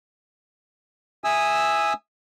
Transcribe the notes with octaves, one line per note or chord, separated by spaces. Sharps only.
E5 G#5 D#6 E6